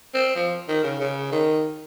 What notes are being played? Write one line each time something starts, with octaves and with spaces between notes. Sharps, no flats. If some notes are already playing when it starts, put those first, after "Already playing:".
C4
F3
D#3
C#3
C#3
D#3